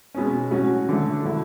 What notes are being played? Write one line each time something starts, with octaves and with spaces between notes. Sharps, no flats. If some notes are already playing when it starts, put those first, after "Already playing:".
B2 G#3 C#4
A2 F#3 C#4 F#4
D3 F#3 A3
D3 A3 E4